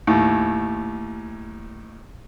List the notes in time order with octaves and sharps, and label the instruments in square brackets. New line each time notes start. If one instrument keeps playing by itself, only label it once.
[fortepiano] D#2 A2